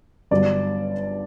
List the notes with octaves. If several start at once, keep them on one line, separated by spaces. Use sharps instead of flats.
G1 G2 F#3 B3 D5